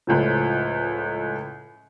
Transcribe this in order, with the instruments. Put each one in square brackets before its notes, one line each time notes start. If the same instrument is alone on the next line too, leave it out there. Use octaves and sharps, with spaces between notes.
[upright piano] C#2 A2 F3